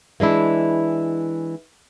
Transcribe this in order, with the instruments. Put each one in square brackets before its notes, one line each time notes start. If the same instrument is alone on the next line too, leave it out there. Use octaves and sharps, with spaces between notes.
[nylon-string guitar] E3 G#3 D4 E4